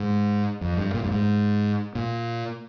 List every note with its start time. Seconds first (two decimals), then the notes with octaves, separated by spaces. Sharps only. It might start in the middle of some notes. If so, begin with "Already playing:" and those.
Already playing: G#2
0.61 F2
0.77 G2
0.94 A#2
1.04 G2
1.11 G#2
1.95 A#2